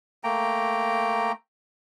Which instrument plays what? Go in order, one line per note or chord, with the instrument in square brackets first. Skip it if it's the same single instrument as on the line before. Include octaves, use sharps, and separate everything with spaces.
[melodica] A3 A#3 G5 A#5